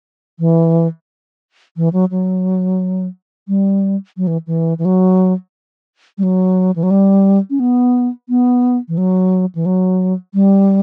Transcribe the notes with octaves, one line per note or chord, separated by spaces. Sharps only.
E3
E3
F#3
F#3
G3
F#3
E3
E3
E3
F#3
G3
F#3
E3
F#3
G3
C#4
B3
B3
E3
F#3
E3
F#3
G3